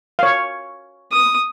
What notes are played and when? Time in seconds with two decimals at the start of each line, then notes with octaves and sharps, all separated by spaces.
0.19 C#5 F5
1.12 D#6